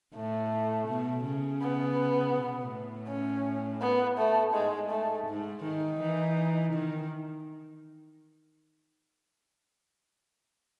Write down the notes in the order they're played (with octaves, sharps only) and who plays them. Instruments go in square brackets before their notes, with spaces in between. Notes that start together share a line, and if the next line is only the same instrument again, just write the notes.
[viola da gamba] A2 [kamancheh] A3
[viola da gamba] B2
C#3
[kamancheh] B3
[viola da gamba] B2
A2
[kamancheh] C#4
B3
A3
[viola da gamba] G#2 [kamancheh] G#3
[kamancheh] A3
[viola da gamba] G#2
[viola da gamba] D#3 [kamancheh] D#4
[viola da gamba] E3
D#3